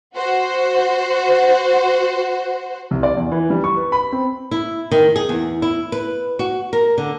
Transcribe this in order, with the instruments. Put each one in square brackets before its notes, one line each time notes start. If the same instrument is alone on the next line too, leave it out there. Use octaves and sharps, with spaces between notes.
[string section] F#4 C5
[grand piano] C2
D5
E2
E3
G3
C#6
B4
B5
C4
[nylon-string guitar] E4
D#3
G#4
E2
E4
B4
F#4
A#4
D3